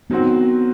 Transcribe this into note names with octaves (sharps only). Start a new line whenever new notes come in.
D#3 F#3 B3 C4 F#4